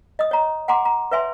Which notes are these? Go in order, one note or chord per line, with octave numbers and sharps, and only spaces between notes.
D#5 D#6
C#5 A#5
F#5 G#5 A#5 C6 D6
A#5
B4 C#5 E5 G#5 C6